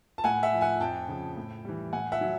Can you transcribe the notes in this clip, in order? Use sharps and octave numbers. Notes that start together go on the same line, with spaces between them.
A5
A2 F#5 G#5
E5 F#5
F3
F#5 G#5
F2 G5 A5
C#3 F3
A2
E3 G3
A2 F#5 G#5
E5 F#5
F#3